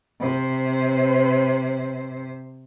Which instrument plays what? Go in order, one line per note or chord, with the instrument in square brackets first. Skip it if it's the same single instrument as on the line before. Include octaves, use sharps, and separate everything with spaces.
[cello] C3 C5